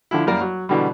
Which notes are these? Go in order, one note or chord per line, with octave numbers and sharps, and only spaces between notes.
D3 F3 E4
F#2 G3 A#3 A#4 D5
F#3
B2 D3 E3 G3